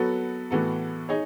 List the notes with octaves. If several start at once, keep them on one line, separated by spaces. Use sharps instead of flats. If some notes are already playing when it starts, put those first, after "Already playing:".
Already playing: F#3 B3 F#4 A4
A2 E3 B3 F#4 A4
D#4 G#4 C#5